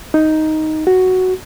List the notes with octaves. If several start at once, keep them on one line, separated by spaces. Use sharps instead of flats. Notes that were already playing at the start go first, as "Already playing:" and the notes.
D#4
F#4